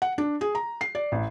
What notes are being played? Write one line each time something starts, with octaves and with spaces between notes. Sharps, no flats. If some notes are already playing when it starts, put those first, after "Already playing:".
F#5
D4
G#4
A#5
C7
D5
A1